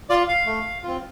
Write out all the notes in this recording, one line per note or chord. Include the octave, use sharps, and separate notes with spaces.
F4 D5
F5
A3
C4 F4